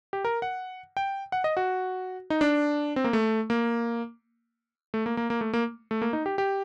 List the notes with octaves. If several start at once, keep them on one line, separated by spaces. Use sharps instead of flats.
G4
A#4
F#5
G5
F#5
D#5
F#4
D#4
D4
C4
A#3
A3
A#3
A3
A#3
A#3
A#3
A3
A#3
A3
A#3
D#4
G4
G4